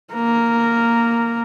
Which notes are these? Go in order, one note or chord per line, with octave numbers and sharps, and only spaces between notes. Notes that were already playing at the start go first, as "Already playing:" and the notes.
A#3 A#4